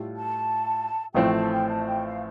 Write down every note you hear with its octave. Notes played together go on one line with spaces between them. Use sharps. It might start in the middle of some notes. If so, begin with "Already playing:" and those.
Already playing: A2 G3 F4 A4
A5
A1 A2 F3 A3 C4 G5
A5
G5
A5
G5
F5